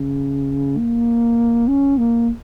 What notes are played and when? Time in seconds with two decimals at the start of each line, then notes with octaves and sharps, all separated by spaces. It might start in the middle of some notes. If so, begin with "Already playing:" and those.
Already playing: C#3
0.78 A#3
1.68 C#4
1.98 A#3